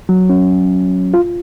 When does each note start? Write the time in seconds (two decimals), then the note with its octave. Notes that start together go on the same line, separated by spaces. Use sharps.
0.09 F#3
0.30 C#4
1.14 F4